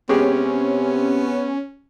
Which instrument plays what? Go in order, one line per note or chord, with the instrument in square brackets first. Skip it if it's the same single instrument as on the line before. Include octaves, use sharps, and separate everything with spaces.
[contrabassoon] C3 [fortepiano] G#3 G4 G#4 [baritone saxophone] B3 [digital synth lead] C#4